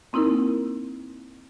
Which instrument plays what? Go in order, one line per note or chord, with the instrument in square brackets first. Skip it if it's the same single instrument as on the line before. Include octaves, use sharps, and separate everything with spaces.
[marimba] A#3 C4 D#4 E4 A#4